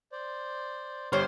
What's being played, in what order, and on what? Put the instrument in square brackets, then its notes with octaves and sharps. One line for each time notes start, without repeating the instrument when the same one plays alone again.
[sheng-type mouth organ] C5 D5
[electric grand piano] G1 G3 F6 [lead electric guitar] C5 [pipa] C#5 C#6